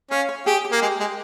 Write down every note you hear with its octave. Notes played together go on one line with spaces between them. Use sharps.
C#4 F5
C#5
G4 G#4
G4
A#3
G#3 G4
G#3